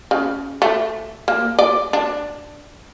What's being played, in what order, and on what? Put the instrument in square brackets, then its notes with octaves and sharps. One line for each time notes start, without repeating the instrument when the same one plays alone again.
[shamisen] C#3
A3
A#3
D5
D4